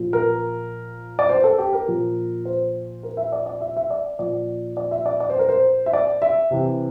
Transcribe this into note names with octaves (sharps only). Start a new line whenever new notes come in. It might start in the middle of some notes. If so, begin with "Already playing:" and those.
Already playing: A#2 F3
A#4
D5
C5
A4
G4
A#4
A#2 F3
C5
A#4
E5
D5
D5
E5
E5
D5
A#2 F3 D5
D5
E5
D5
D5
C5
A#4
C5
E5
D5
E5
C3 E3